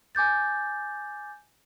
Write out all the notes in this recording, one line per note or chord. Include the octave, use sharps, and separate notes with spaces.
G#5 D6 G6 A6